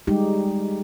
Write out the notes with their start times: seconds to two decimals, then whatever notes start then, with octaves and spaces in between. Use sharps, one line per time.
0.07 G3 G#3 D#4 G4